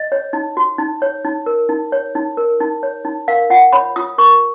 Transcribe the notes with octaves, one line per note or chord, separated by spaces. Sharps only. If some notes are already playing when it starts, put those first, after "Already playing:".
Already playing: D#5
C#5
D#4
F#4
D#4
C#5
D#4
A#4
D#4
C#5
D#4
A#4
D#4
C#5
D#4
A#4 F5
F4 F#5
C#5 B5
F4 D#6
A#4 C#6